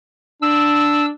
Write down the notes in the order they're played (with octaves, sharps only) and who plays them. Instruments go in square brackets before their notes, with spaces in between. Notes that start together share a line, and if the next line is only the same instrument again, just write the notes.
[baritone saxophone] D4 [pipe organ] E6